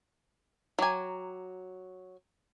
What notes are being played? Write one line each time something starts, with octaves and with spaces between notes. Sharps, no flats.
F#3 G5 G#5 A#5 D6